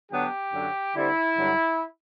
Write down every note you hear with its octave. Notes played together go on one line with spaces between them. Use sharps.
D3 F#3 B3 D4 G4
F#2 D3 F#3
D3 G3 C4 E4
G2 D3 F#3